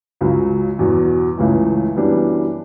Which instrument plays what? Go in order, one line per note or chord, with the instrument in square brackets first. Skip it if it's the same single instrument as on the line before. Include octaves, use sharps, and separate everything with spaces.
[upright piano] C#2 C#3 F#3
E2 B2 F#3
C#2 C#3 E3 A3
F#2 E3 G3 B3 D4